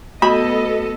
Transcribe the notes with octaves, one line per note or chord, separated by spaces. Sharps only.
A3 B3 F#4 A4 D#5 B5 D#6